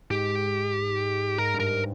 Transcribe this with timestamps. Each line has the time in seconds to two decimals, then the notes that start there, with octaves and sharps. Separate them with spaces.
0.10 G#2 G4
1.38 G#2 A#4
1.54 G2
1.60 A#4